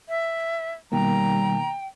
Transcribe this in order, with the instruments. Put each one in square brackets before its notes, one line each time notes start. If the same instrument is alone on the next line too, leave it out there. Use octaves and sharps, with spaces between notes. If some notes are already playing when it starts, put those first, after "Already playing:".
[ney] E5
[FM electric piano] B2 D#3 A#3 [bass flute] G3 [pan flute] G5 [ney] A#5